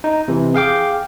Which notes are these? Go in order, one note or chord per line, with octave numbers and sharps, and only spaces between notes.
D#4
C3 E3
G#4 F5 G5 D6